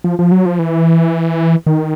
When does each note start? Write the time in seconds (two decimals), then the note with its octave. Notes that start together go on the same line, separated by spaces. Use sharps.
0.04 F3
0.19 F3
0.32 F#3
0.46 F3
0.59 E3
1.67 D#3